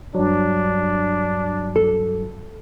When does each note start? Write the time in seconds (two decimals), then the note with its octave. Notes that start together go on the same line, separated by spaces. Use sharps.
0.15 G2 F#3 D4
1.76 A4